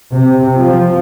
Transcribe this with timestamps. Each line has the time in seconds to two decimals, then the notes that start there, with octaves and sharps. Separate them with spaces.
0.12 C3
0.57 F3